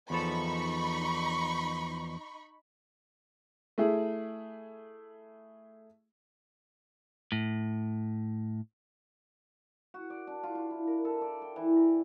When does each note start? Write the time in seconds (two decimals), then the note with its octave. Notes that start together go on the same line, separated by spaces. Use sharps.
0.10 E2 F3 D#4 A4 B5 C#6
3.78 A3 E4 G#4
7.32 A2
9.94 F#4
10.10 D5
10.27 D4
10.43 F4
10.55 F4
10.71 E4
10.87 A#4
11.05 A4
11.21 D5
11.42 G5
11.56 E3
11.76 A#5